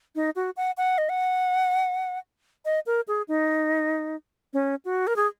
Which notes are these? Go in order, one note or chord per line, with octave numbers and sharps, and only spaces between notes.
D#4
F#4
F#5
F#5
D#5
F#5
D#5
A#4
G#4
D#4
C#4
F#4
A#4
G#4